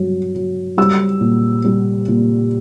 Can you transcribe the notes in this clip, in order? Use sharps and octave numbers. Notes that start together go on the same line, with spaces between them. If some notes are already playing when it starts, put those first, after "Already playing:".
Already playing: G2 F#3
F#3
G3 E6
A#2
G3
A#2